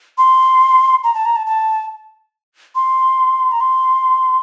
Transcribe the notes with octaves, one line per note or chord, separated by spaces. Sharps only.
C6
A#5
A5
A#5
A5
A5
C6
A#5
C6